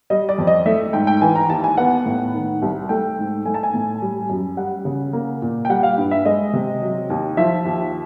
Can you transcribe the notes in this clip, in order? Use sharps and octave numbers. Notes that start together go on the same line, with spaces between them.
G3 D#5
D5
F2
D#5
A3 E5
G#2 G5
G5
E3 G#5
A#5
D#2 A5
G#5
B3 F#5
A2
D#3
C2
A3 G5
G#2
A3 G#5
A5
G#5
A2
G3
F#2
G3 F#5
C#3
A#3
A#2
G5
G3 F#5
F5
G2
E5
G#3 D#5
C3
F#3
D#2
F3 E5
D#2